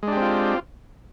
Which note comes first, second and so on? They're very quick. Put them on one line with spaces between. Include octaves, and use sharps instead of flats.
G#3 D4 G4 C4 F4